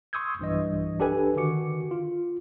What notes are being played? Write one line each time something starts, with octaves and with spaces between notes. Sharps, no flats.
C6 C#6 D#6 E6 G6 G#6
B1 G2 E3 D#5
D4 G4 A4 B4 G#5
D3 D#3 F#4 D6 C#7
F4